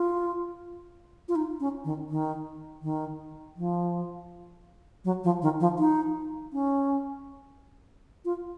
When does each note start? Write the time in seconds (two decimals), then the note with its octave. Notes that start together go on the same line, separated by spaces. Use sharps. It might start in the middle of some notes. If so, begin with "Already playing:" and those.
Already playing: F4
1.28 F4
1.35 D#4
1.60 C#4
1.84 D#3
2.09 D#3
2.82 D#3
3.57 F3
5.04 F#3
5.24 F3
5.42 D#3
5.60 F3
5.79 D#4
6.53 C#4
8.25 F4